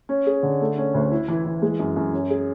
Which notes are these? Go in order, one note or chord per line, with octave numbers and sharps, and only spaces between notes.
C#4
G#4
D3
A3
C#4
D2
E4
E3
E3
G#3
F#2
F#2
C#4
G#4